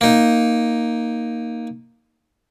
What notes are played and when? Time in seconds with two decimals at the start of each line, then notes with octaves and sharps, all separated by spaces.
0.01 A#3 D#4